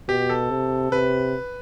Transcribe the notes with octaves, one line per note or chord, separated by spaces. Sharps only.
B2 G4
A4
C3
C3 B4